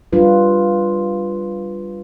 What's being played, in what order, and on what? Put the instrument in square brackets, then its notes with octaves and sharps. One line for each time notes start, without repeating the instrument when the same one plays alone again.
[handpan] G3 D4 F4 B4